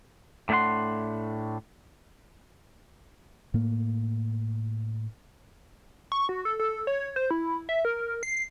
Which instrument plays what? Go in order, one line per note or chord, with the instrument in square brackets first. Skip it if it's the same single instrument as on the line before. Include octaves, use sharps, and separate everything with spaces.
[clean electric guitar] A2 A3 D4 E4 F#5 C6
[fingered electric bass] A2 A#3
[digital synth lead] C#6
F#4
A4
A4
C#5
C5
E4
E5
A#4
C7